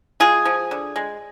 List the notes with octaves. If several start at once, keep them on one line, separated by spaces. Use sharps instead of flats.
G#3 F4 G#4
F3
D3
G#3